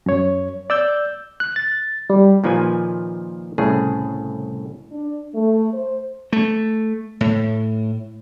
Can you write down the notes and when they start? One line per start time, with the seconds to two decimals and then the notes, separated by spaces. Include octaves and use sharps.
0.06 F#2 C#5
0.70 D5 E6 G6
1.40 F#6
1.56 A6
2.10 G3
2.44 A#2 D#3 F3 B4 G#5
3.58 C2 A2 C#3 G#4
4.92 D4
5.35 A3
5.73 C5
6.33 A3
7.21 A2